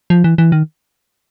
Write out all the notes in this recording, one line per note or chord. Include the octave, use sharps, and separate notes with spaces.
F3
E3
E3
D#3